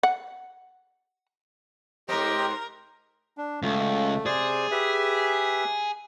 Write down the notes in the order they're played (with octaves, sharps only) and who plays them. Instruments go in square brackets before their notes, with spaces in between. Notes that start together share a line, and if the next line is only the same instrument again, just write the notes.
[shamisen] F#5
[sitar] G#2 C4 [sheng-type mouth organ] G4 D#5 G5 [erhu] A#4
[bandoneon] D4
[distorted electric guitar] C#2 [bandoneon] A3
[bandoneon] C3 C5 D5 [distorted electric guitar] G#4
[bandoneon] G4 B4 E5